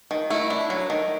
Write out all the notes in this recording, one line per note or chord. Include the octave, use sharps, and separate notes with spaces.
D#3
A3 E4
D4
F#3
D#3